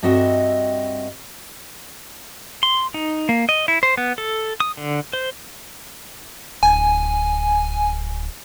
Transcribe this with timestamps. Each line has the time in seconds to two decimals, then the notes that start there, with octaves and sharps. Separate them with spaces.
0.03 G2 C4 F#4 D#5 E5
2.63 C6
2.94 D#4
3.29 A#3
3.49 D#5
3.68 E4
3.83 C5
3.97 B3
4.18 A4
4.60 D#6
4.77 D3
5.13 C5
6.63 D1 G#5